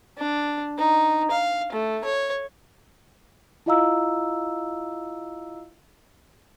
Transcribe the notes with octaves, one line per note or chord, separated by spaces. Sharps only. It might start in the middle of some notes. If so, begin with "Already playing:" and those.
D4
D#4
F5
A3
C#5
E4 F4 D#5 F5 A#5 E6